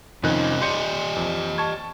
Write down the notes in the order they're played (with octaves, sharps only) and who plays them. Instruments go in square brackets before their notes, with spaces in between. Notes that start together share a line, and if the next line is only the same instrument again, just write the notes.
[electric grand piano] F2 D#3 F#6 [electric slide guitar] C3 C#4 D#5
[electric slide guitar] G4 D5 D#5 [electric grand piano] C6 G6 C#7
[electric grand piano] F2
A5 C#6 G#6